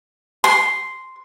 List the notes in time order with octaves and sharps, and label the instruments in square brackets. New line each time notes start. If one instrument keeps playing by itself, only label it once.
[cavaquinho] C6